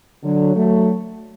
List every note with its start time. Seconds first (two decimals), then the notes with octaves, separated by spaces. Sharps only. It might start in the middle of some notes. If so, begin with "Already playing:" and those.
0.23 D3 F#3
0.55 F#3 A3